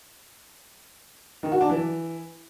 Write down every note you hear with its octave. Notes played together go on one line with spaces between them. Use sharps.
D#3
F#4
D4
E3